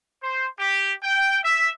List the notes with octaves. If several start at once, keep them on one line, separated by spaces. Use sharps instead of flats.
C5
G4
G5
E5